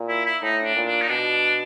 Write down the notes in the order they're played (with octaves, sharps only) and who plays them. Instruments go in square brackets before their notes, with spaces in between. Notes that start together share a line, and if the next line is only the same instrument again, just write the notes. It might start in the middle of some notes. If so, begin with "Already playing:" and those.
Already playing: [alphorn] A#2
[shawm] E4
E4
[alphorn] A2 [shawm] D#4
[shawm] D4
[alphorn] A#2
[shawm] D4
D#4
[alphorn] B2 [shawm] D4